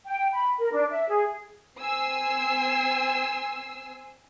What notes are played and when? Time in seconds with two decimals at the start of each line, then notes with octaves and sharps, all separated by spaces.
0.06 G5
0.33 B5
0.58 A#4
0.72 D4
0.91 E5
1.09 G#4
1.78 C4 G#5 E6 C7